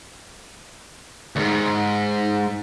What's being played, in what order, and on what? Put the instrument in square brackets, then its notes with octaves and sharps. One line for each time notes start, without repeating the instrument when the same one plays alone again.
[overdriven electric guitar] D2 G#2